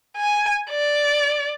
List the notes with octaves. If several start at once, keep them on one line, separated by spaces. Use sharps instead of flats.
G#5
D5